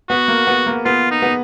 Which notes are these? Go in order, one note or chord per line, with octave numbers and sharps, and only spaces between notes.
B3 F#4
A#3
B3
A#3
B3 F4
D#4
B3